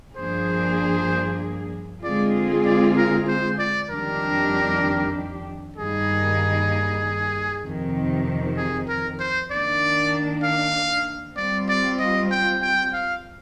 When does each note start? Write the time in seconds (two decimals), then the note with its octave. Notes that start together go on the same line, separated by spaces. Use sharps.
0.16 G2 F3 A#3 D4 G#4 C5
2.03 D3 G#3 C4 F4 G#4 D5
2.65 D5
2.96 A#4
3.28 C5
3.59 D5
3.90 F2 D#3 G3 D4 G4 A#4
5.77 G2 D#3 G3 A#3 D#4 G#4
7.64 F2 C3 D#3
8.57 G#4
8.88 A#4
9.20 C5
9.51 D#3 A#3 D4 D5
10.43 F5
11.37 G3 C4 F4 D5
11.69 D5
11.99 D#5
12.31 G5
12.62 G5
12.93 F5